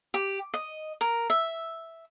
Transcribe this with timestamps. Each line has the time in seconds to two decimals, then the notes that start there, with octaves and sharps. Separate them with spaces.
0.14 G4
0.54 D#5
1.01 A#4
1.30 E5